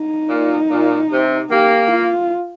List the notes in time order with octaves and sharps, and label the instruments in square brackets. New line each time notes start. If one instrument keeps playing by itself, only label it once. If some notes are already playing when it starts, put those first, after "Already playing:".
Already playing: [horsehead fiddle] D#4
[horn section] A#2
A#2
C3
[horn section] A#3 [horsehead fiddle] G4
[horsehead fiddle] F4